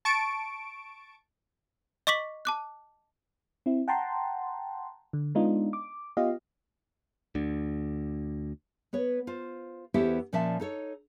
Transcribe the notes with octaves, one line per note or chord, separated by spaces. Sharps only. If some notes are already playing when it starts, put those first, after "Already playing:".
A5 C#6 D7
D#5 C#6 D6 B6 F#7
A5 D6 F#6
C4 E4
F#5 G5 A5 A#5 C6
D3
G#3 B3 D4 D#4 F4
D6
B3 F4 G4 D#5 F5
D2 D3
B3 B4 C#5
F4 C5
E2 B3 E4 G4 A4 C5
A#2 F3 C#4 D5 E5 A5
D#4 A4 C#5